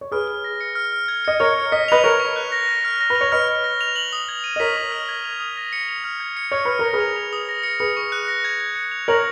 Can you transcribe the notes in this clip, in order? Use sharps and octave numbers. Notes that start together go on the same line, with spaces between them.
C#5
G#4 B4 F6
F6
A#6
C#7
F6
F6
G#6
D#5 C#7
A#4 C#5 F6
F6
D#5 B6
B4 D#5 F7
A#4 C#5 C#6
C#6
F#6
A#6
F6
F6
A#6
B4
F7
C#5
B4 D#5 F6
F6
A#6
F7
F#7
D#6
G#6
D#7
D#5
A#4 C#5 B6
C#6
F6
G#6
F7
D#6
A#6
C#7
F7
F6
G#6
C#7
C#5 F6
B4 F6
A#4 A#6
G#4 B4
F7
F7
D#6
A#6
C#7
G#4 B4 C#7
C#6
F#6
A#6
G#6
G#6
C#7
F7
A#4 C#5 F#7